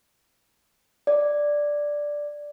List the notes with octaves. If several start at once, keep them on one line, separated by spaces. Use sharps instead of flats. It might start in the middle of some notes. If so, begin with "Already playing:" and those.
D5